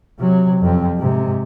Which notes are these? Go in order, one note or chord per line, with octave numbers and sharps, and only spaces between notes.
C3 F#3
F2 C4
G#2 C3